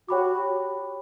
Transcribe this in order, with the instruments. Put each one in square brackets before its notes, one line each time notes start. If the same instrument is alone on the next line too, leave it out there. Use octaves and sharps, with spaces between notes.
[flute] F#4 [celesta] G4 C#5 G5 B5 D6